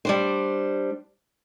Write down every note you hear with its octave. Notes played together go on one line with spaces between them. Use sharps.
G3 D4 C5